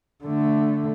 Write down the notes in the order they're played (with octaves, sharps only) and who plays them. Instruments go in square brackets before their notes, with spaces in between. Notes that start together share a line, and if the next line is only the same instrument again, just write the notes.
[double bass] D3 A3